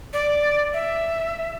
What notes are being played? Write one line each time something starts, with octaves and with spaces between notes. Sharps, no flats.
D5
E5